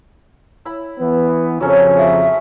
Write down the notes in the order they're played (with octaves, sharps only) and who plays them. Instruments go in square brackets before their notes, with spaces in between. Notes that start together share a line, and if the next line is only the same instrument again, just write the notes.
[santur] E4 B5
[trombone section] E3 B3
[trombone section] F2 C#3 F3 [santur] F#3 C#4 A4
[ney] E5 [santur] D#6